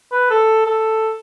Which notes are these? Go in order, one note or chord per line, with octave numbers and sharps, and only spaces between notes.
B4
A4
A4